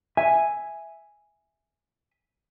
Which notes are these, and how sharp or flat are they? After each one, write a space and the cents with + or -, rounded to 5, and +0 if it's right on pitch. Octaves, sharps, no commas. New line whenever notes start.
E5 +0 G#5 +0